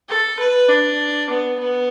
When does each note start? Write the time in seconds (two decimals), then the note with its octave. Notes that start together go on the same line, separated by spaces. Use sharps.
0.09 A4
0.39 B4
0.69 D4
1.30 B3
1.59 B3